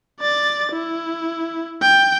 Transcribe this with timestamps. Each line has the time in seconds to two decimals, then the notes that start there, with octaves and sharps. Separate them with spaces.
0.20 D5 A6
0.73 E4
1.82 G5